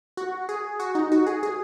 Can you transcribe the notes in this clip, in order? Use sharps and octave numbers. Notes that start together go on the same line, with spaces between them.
F#4
G#4
F#4
D#4
F#4
G#4
G#4